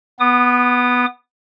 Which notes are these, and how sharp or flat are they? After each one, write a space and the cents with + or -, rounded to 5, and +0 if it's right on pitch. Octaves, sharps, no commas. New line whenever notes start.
B3 +0 D#6 -35